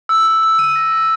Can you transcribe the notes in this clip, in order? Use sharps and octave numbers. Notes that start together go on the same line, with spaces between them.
E6
E6
E6
D#7
A#6
D#7